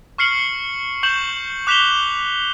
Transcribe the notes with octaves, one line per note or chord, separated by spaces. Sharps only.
C#6 F6 C7 C#7 F#7
C#6 G6 E7 F#7
D6 F#6 B6 E7 F7 G7